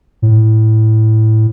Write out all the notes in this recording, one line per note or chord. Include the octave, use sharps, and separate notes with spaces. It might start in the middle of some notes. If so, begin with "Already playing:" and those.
A2